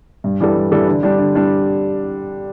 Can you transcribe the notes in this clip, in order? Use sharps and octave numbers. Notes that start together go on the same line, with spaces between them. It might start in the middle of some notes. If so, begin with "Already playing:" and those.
G2
E3 G3 D4 A4
G2
E3 G3 D4 A4
D3
G3 D4
D3
G3 D4